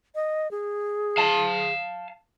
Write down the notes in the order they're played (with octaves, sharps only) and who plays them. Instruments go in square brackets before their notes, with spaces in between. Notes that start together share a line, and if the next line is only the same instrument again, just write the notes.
[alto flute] D#5
G#4
[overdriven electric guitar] F5 A5